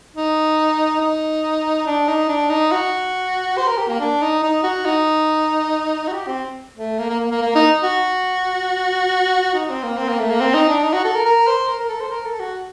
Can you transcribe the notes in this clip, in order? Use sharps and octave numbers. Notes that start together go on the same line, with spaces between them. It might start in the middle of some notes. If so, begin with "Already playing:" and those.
D#4
D#4
D4
D#4
D4
D#4
F#4
C5
A#4
G4
A#3
D4
D#4
D#4
F#4
D#4
F#4
G4
C4
A3
A#3
A#3
A#3
A#3
A#3
D#4
F#4
D#4
C4
A#3
C4
A#3
A3
A#3
C4
D#4
D4
D#4
F#4
A4
A#4
A#4
C5
A#4
A#4
A4
C5
A#4
A4
F#4